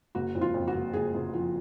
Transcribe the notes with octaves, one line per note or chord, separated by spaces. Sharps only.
F#1 F#4
F2
F4
F2
F#4
F#1
F#1 G#4
F#1
F3